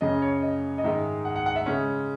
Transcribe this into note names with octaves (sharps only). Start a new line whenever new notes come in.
F#2 C#3 F#3 C#4 D#5
C#5
D#5
D#5
G#2 D#3 G#3 D#4 E5
F#5
F#5
F#5
E5
C#3 G#3 C#4